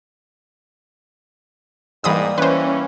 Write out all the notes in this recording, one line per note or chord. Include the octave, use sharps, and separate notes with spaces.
G#2 E3 G3 A#3 B5 D#6
E3 C#4 B4 C5